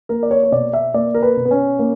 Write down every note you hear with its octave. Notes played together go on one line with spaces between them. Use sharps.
A#3 A#4
D5
C#5
C#5
B2 D5
E5
A#3 D5
A#4
B4
B2
B3
C#4
A#3